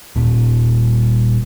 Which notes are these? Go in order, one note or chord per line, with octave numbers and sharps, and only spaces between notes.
D#1 A#2